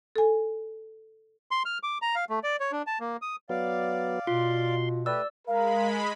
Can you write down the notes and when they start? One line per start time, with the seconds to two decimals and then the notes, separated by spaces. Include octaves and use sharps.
0.16 A4 G#5
1.51 C6
1.65 F6
1.83 D6
2.02 A#5
2.15 F5
2.30 A3
2.43 D5
2.60 C#5
2.72 D4
2.87 A5
3.00 A#3
3.22 D#6
3.49 F#3 B3 D5 F5
4.27 B2 F4 C6
5.06 A3 G4 B4 D5 E6
5.48 G#3 A#4 F5 B5